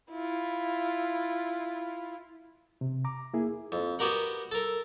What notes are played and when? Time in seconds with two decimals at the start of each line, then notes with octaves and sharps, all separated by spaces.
0.11 E4 F4
2.81 C3
3.05 A#5 D6
3.34 A#3 E4 G#4
3.72 F2
3.99 B3 F#4 G4 A#4 F#5
4.51 A4 A#4